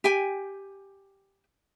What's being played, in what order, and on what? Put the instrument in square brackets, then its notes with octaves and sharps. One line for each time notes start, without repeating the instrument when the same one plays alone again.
[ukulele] G4 G5 G#5